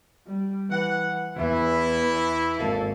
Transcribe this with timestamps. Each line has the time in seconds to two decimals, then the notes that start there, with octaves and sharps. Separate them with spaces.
0.27 G3
0.70 E3 F#5
1.36 E2 E3 E4
2.59 G#1 A#3 A4